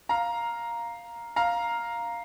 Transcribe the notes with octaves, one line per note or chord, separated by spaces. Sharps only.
F5 A#5
F5 A#5